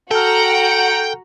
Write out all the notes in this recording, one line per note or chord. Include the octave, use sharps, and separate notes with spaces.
F#4 A4 F#5 G5 A#5 F6